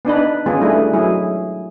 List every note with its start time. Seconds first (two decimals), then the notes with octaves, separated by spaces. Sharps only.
0.05 B3 D4 D#4 B4
0.46 D#3 G#3 B3 C#4 F4 G#4
0.61 G3 A3 D4 E4 G#4 B4
0.93 F#3 G#3 E4 G#4